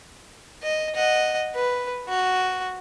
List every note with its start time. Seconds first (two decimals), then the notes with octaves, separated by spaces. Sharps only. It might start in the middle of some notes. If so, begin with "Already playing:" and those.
0.63 D#5
0.96 D#5 F#5
1.55 B4
2.09 F#4